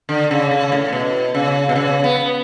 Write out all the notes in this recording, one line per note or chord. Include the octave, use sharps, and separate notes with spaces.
D3
C#3
C#3
A2
B2
C#3
B2
C#3
B3